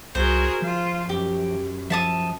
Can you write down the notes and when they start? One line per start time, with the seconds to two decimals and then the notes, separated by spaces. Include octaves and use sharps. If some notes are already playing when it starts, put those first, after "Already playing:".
0.15 C2 F#4 G#4 A#4 C5
0.62 F3 F4
1.09 F#2 G4
1.90 F3 E5 A5 D#6